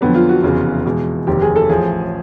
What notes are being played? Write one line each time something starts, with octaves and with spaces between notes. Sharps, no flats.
F2 D3 F#3 B3
F4
F#4
F1 E2 C#3
E2 B2 G#3
F1 D#2 D#3 G4
G#4
A4
A1 A2 F3 G#4